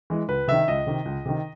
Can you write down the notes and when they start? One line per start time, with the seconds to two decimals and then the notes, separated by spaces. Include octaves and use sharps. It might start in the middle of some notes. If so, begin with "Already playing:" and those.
0.10 E3 G#3
0.28 C#2 B4
0.48 C3 D#3 E5
0.68 C#2 D#5
0.87 C3 D#3
1.05 C#2
1.26 C3 D#3